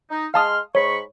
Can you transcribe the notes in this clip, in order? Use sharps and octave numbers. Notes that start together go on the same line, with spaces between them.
D#4
G#3 F5 A5 C6 D#6 F6
G#2 C#5 B5 C#6